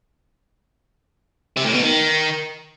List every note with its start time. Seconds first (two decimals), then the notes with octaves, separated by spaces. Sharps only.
1.57 C3
1.66 A2
1.74 B2
1.83 D#3